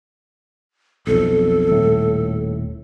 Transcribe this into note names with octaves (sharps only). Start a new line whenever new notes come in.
B1 F2 A4
D#1 A2